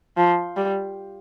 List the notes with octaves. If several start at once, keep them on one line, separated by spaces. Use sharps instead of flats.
F3
G3